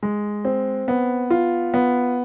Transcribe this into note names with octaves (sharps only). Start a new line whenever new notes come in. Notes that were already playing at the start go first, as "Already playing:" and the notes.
G#3
C4
B3
F4
B3